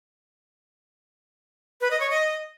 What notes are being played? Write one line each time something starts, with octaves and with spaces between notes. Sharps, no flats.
B4
D#5
C#5
D#5